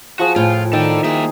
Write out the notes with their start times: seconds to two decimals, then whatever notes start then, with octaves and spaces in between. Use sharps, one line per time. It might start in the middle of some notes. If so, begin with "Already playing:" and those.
0.19 F3 F#4 G#4
0.36 A2 F4 G5 G#5
0.73 D#3 A4 D5 G5
1.04 A#3 G#4 E5